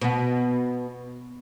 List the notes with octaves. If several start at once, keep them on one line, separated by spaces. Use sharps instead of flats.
B2 B3